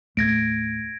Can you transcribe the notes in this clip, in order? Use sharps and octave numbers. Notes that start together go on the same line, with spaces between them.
D#2 A2 A3 G#6 A#6 D7